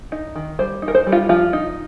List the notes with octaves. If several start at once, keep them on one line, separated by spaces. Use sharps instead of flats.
D#4
D#3
G3 C5
D#4
A#4
C5
G3
F4
F3 F4
D#4